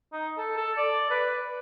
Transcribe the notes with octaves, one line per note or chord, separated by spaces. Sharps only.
D#4
A4
A4
D5
B4